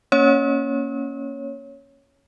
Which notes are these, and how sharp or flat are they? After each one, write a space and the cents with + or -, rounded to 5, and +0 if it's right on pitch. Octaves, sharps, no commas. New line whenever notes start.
A#3 +5 C#4 +0 C#5 +0